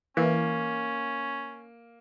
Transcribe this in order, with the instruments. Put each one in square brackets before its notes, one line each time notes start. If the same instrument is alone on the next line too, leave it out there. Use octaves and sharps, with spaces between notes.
[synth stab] E3 [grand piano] A#3 [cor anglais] C#4